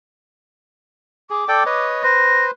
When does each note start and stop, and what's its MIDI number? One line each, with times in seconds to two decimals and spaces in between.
1.30 1.44 68
1.30 1.86 86
1.48 1.64 69
1.48 1.64 74
1.48 1.64 79
1.66 2.03 71
1.66 2.03 73
1.66 2.03 75
2.03 2.51 71
2.03 2.51 72
2.03 2.45 94